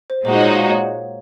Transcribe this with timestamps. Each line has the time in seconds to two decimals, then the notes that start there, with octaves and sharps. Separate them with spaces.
0.10 C5
0.25 A#2 G#3 D#4 F#4 C5
0.41 C#5
0.56 F5
0.70 C#5